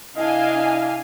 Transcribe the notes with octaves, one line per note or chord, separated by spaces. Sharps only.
C3 D4 E4 D#5 F5 G#5